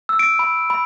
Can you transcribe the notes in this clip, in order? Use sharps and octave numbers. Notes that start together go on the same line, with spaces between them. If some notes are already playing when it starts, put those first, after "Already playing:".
E6
D7
B5
B5